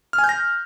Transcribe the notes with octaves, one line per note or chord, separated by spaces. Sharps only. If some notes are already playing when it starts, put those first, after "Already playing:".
F6
G#5
G6
A#6